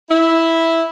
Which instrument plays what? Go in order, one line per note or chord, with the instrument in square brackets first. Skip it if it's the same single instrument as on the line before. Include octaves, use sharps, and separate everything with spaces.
[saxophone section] E4